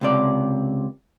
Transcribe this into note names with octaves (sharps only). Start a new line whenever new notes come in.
C#2 C3 D5